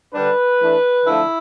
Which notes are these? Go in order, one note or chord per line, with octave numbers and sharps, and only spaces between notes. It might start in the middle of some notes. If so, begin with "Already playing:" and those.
D3 G3 D4 B4
E3 A3 D4
D3 F3 A3 E4